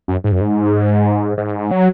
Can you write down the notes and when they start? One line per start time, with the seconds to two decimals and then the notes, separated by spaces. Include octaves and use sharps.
0.08 F#2
0.24 G#2
0.32 F#2
0.41 G#2
1.38 G#2
1.71 F#3